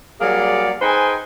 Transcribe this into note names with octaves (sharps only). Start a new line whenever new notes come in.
F#3 G3 A#3 G#4 D5
D#4 G#4 B4 C5 G5 G#5